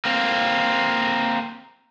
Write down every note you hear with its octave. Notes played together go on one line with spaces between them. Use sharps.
A#3 C4